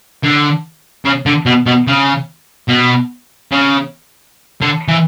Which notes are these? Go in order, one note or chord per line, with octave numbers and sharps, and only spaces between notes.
D3
C#3
D3
B2
B2
C#3
B2
C#3
D3
E3